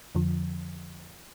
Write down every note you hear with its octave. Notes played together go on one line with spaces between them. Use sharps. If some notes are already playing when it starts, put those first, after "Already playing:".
F2 D3 F3